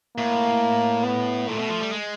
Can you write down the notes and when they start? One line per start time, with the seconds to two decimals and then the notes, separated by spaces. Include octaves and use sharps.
0.17 A2 A#3
1.05 B3
1.48 A#2 A3
1.59 B2
1.70 F3
1.81 G3
1.92 G#3